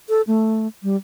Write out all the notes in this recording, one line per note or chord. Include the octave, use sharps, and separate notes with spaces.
A4
A3
G3